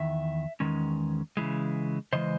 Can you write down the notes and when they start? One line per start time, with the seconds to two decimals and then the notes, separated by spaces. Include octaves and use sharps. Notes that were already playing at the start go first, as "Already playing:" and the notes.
Already playing: E2 D#3 E5
0.60 E2 D#3 G#3 C#4
1.37 C#3 E3 G#3
2.13 C#3 E3 G#3 C5 D#5